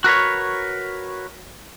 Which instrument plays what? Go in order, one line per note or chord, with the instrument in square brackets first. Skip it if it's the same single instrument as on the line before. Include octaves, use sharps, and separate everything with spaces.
[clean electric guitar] F#4 A#4 B4 C#5